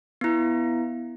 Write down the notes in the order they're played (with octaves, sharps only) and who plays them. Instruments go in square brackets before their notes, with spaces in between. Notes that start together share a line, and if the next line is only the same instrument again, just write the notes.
[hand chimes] B3 E4